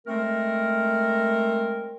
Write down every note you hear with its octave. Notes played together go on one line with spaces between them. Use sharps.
G#3 A3 C4 A#4